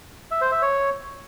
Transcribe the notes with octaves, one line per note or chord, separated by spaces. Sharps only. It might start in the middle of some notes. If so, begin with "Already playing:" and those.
E5
C5
E5
C#5